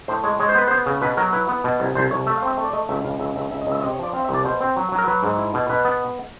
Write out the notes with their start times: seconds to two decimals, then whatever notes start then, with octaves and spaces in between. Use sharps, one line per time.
0.08 A2 C5
0.24 G#3 C#5
0.39 G#3 C#5
0.49 C5
0.55 B3 B4
0.68 B3 C5
0.86 C#3
1.02 B2 B4
1.17 F#3 A#4
1.33 E4 B4
1.48 B3
1.64 B2
1.80 C2
1.95 C2 C5
2.11 C2 C#5
2.26 A3 E5
2.37 F5
2.42 C4
2.47 E5
2.58 A3
2.64 D5
2.73 A3 D#5
2.89 C#2 E5
3.05 C#2 F5
3.20 C#2 E5
3.36 C#2 E5
3.51 C#2 E5
3.61 D#5
3.67 C#2 E5
3.78 E5
3.82 C3 D#5
3.93 C#5
3.99 F3 D5
4.13 C4 F5
4.24 E5
4.29 C2
4.34 D5
4.45 B2 C5
4.61 C4
4.76 F#3
4.92 F#3
4.98 A#4
5.07 F#3 B4
5.23 G#2
5.39 E4
5.54 B2
5.69 B2 B4
5.85 B3